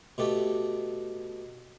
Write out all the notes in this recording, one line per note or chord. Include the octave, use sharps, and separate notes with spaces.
B2 A3 G4 A4